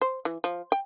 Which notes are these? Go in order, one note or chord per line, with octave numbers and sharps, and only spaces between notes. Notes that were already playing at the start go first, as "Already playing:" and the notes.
C5
E3
F3
G5